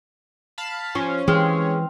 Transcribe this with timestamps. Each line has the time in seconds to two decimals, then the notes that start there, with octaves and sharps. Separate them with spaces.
0.58 F5 A5 B5
0.95 F3 C#4
1.28 E3 G#3 C4 F5